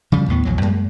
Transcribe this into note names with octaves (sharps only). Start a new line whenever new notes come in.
C#3 F3 G3
D#2 A2 B3
A#1 E2 F#3
F#2 G#3 A#3